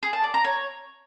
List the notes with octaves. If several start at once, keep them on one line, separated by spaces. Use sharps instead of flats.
G#4
A5
D5
A#5
C#5